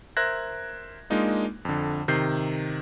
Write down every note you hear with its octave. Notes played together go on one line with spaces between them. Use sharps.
A#4 C5 E5 F#6 G#6 A#6
G#3 A#3 D4 D#4 F4
F2 D3
C3 D#3 G6 C7